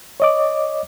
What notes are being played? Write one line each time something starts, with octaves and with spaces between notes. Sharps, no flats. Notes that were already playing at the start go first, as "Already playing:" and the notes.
C#5 D#5 D6